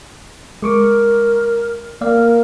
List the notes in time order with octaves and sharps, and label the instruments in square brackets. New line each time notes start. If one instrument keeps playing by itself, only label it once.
[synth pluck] G#3 C#6 D6 [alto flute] A#4
[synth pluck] A#3 D5 F5 [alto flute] A#4